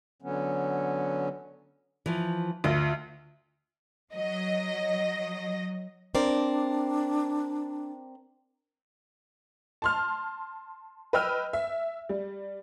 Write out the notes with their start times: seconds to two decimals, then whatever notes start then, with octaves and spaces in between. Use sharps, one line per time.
0.22 D3 F#3 B3 C#4
2.06 E3 F3
2.64 D2 F4 D#5
4.13 F#3 D#5
6.15 C4 D4 A#4 D5
9.82 A5 C6 F6
11.13 B4 D#5 G5 E6 F6
11.53 E5
12.09 G3